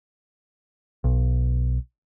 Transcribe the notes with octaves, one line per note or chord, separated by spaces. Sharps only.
B1